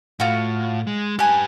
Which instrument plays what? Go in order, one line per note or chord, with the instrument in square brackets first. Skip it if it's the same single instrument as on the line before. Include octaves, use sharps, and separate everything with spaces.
[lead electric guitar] A2 [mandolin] F4 F#4
[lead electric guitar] G#3
[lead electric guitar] G4 B4 [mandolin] G#5 F#6